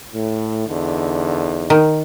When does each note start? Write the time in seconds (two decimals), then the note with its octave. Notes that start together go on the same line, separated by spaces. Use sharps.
0.13 A2
0.66 E2 D3 D#4
1.70 D#3